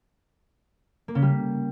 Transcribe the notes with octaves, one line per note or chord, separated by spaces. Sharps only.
A#3
C#3
G3